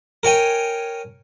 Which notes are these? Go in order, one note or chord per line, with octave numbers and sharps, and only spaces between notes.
A#4 C#5 G5 G#5